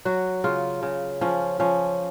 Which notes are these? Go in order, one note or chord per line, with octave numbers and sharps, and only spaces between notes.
F#3 F#4
C#3 F4
C#3
F3 C#4
F3 C#4